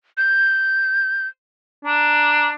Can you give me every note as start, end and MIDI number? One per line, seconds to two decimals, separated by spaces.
0.17 1.27 91
1.85 2.52 62
1.85 2.49 82